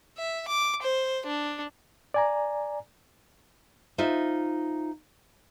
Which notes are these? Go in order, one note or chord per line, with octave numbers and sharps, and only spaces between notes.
E5
D6
C5
D4
D5 G#5 A#5
D#4 F4 C5 E5